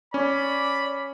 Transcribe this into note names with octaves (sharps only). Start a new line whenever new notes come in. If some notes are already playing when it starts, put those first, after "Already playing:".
C#4 D5 B5